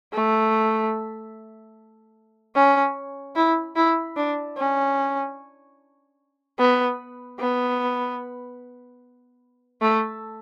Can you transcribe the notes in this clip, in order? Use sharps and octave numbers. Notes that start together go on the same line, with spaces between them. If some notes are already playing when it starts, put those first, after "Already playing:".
A3
C#4
E4
E4
D4
C#4
B3
B3
A3